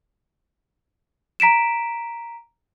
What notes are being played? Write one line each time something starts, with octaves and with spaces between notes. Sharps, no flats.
A#5 B6 D7 E7